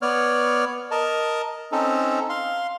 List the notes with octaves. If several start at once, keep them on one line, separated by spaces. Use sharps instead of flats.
B3 C#5 D5 F6
A#4 D#5 A5
C4 C#4 D#4 A4
F5 C6